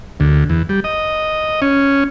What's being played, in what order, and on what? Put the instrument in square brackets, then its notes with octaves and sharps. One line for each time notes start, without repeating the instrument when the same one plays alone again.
[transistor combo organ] D2
E2
G3
D#5
C#4